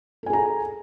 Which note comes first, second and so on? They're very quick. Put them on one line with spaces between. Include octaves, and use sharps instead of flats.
A4 G#5 G#4 A#5